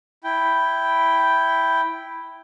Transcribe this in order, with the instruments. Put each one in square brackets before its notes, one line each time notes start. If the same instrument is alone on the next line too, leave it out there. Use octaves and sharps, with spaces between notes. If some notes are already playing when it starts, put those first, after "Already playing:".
[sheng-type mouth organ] E4 G5